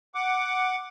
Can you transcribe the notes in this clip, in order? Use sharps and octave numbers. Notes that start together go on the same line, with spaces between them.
F#5 D6